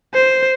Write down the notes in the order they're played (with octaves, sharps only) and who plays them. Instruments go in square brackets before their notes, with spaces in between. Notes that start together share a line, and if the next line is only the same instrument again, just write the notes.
[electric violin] C5